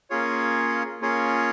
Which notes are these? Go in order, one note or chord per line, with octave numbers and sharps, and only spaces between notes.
A#3 C#4 F4 G#4 C#5
A#3 C#4 F4 G#4 C#5